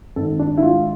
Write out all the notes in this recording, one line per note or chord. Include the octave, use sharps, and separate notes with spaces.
G#1 A4
D4
E4
G#3 F4